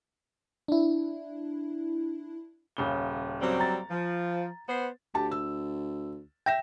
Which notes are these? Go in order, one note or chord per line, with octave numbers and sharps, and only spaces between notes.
D4 E4
D#1 C#3 G7
F#3 G3 C4
A#5 A6
F3
B3 C5
D2 G4 A5
E6
E5 G5 A#6 E7